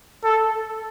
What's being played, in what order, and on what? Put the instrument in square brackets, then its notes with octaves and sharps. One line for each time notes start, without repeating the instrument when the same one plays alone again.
[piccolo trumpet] A4